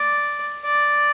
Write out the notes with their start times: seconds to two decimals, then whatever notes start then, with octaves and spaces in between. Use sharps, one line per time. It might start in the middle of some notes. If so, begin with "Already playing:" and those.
Already playing: D5
0.65 D5